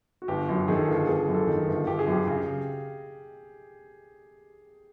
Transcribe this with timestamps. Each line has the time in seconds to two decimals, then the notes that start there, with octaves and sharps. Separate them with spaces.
0.22 F#4
0.28 G1 G4
0.49 F#2
0.68 D#3 G#4
0.76 A4
0.84 G#4
0.88 G1
1.07 G1 G#4
1.28 F#2
1.34 A4
1.47 D#3
1.68 G1
1.87 G1 G4
1.99 G#4
2.07 F#2 G4
2.27 C#3 G4